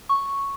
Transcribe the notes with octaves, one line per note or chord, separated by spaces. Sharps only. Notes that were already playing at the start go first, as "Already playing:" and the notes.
C#6